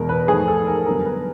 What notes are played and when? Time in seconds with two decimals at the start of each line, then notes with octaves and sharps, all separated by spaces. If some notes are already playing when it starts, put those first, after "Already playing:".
Already playing: E2 B2 G#3 A#4
0.09 B4
0.28 G#2 F3 A3 G#4
0.48 A4
0.67 A#4
0.86 F#2 D3 G3 B3 A#4
1.05 B4